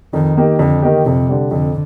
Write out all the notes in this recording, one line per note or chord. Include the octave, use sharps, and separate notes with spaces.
F2 D#3
D#3 A#3 D#4 G4
F2 D3
D#3 A#3 D#4 G4
F2 C3
D3 G3
F2 D3